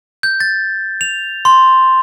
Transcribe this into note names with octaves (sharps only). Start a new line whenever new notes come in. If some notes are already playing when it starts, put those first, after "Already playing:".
G6
A6
F7
C6